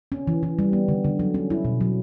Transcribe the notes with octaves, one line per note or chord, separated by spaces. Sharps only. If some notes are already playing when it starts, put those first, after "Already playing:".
C#4
E3
E3
G3
B3
D3
D3
F#3
C#4
E4
B2
F#3